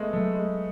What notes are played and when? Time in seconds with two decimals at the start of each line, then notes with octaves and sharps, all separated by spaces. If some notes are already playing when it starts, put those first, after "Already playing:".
Already playing: G#3 A3 B3
0.13 F#3 A3
0.34 G#3